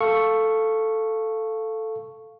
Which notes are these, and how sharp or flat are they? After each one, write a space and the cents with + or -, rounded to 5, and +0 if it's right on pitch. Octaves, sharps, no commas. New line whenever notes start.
A4 +0 F5 -5 C#6 +0